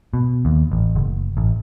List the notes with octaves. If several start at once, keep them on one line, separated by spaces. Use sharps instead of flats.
B2
D#2
A1
F#1
A1